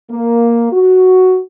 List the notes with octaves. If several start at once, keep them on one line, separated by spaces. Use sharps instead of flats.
A#3
F#4